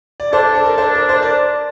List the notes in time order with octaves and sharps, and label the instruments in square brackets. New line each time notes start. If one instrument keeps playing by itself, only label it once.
[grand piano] D5
[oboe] D4 [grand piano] A4 C5
[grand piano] A4
A#4
A4 C5
A#4
C5
A#4 D5